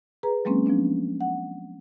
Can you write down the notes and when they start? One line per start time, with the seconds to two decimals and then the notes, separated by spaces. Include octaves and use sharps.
0.23 G#4 B4 A#5
0.45 F#3 G#3 A#3 C4 C#4
0.66 F3 B3 C#4 D4
1.21 F#5